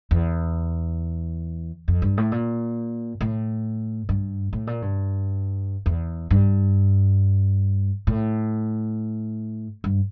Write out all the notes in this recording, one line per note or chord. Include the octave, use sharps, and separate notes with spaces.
E2
F2
G2
A2
A#2
A2
G2
A2
A#2
G2
E2
G2
A2
G2